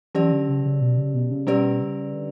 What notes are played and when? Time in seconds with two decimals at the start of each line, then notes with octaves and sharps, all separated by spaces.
0.15 E3 F#3 C#4 G4 D5
0.32 D3
0.48 C#3
0.65 C#3
0.81 B2
0.98 C#3
1.14 B2
1.31 C#3
1.47 B2 G3 C#4 G4 B4 D5
1.80 C#3
2.14 D3